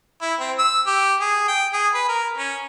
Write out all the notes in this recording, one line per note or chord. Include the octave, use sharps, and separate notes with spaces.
E4
C4
E6
G4
G#4
G5
G#4
B4
A#4
C#4